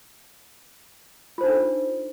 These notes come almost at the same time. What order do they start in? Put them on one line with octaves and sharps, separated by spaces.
F4 C5 D#4 D4 A4